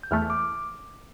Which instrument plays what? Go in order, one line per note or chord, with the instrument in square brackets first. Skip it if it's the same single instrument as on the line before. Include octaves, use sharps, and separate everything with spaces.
[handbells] G6
[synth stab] E2 E3 A3 [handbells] F6
[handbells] D6